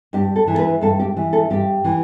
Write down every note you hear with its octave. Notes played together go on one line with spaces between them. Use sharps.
G2 G4
A4
E3
A4
B4
G2 A4
G4
E3
A4
G2 G4
E3